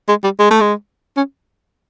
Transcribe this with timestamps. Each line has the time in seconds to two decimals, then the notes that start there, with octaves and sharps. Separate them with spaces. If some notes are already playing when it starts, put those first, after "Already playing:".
0.08 G#3
0.24 G3
0.39 G#3
0.50 A3
0.61 G#3
1.17 C#4